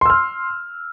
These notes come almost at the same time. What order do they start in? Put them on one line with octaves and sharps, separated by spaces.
C6 E6 F6